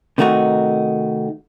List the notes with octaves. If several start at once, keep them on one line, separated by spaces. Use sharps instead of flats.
C3 D#3 A3 D#4 F#4